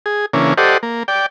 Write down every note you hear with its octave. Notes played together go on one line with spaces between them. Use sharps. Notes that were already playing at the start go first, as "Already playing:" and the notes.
G#4
C#3 E3 A#3 C#4 D4
G4 A4 C5 D5 D#5 F#5
A#3
D5 G5